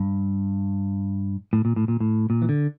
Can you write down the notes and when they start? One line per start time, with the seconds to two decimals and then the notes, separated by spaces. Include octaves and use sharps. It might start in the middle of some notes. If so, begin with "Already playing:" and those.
Already playing: G2
1.53 A2
1.65 A#2
1.76 A2
1.88 A#2
2.00 A2
2.30 A#2
2.42 E3
2.49 D3